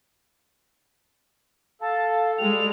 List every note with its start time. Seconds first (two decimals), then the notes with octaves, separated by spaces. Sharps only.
1.81 A4 F5 A5
2.38 G3 G#3 G5 F7